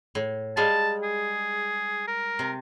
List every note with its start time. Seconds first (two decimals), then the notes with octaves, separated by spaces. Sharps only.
0.15 A2
0.57 G3 G#3 F5 A5
1.03 G#4
2.08 A#4
2.39 C3